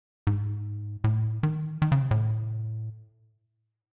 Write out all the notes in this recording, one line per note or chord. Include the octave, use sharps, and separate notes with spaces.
G#2
A2
D#3
D#3
C#3
C3
A2